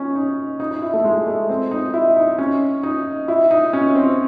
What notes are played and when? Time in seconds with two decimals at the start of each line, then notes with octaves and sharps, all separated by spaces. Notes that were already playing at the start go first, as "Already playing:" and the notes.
Already playing: C#4 D#4
0.15 D#4
0.60 D#4
0.71 D#4
0.82 E4
0.94 A3
1.04 G#3
1.27 A3
1.49 C4
1.71 D#4
1.94 E4
2.17 D#4
2.38 C#4
2.83 D#4
3.28 E4
3.51 D#4
3.73 C#4
3.95 C4